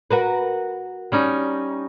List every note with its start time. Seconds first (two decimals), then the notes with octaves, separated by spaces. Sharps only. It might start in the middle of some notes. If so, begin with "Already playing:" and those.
0.11 F#4 A#4 B4
1.12 G3 C#4 D#4